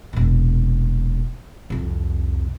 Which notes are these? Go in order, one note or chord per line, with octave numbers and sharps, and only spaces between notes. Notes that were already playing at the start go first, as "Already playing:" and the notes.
E1 A#2
C2 F2